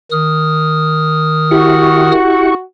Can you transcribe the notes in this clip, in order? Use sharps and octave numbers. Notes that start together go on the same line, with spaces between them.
D#3 D#6 F6
E4 F#4 G4 C#6